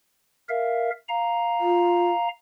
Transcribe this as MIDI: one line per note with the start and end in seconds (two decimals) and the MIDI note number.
0.49 0.90 70
0.49 0.90 76
0.49 0.90 77
1.08 2.28 77
1.08 2.28 82
1.60 2.11 65